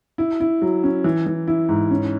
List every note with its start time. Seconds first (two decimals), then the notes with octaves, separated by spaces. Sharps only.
0.18 E4
0.40 E4
0.62 F#3
0.84 C#4
1.04 E3
1.26 E3
1.47 E4
1.69 G#2
1.91 C#4